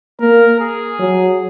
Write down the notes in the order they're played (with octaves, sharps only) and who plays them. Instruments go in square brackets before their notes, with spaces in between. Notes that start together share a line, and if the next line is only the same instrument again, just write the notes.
[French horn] A#3 [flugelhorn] A#4
[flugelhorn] G#4
[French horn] F#3